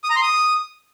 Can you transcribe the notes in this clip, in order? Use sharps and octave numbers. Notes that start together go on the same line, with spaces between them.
D#6
A#5
C6
D#6